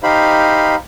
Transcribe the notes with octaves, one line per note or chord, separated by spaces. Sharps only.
D#4 G4 C5 F5 B5